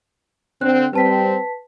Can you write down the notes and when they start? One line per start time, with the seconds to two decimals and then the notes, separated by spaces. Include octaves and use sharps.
0.61 D3 C4 F#6
0.93 G3 C4 B4 A5 B6